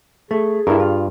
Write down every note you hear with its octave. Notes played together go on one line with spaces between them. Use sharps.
A3 G#4
G2 E4 A#4
F4